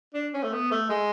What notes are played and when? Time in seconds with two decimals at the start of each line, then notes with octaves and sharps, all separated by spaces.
0.14 D4
0.34 C#4
0.43 A3
0.53 B3
0.71 A3
0.90 G#3